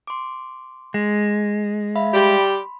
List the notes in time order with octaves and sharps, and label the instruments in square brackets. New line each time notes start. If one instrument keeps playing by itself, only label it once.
[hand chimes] C6 D6
[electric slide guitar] G#3
[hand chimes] E5 F5 B5
[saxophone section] G3 G4 [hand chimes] B5 C6